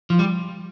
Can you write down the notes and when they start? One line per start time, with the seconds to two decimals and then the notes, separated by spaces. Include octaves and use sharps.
0.10 F3
0.19 G3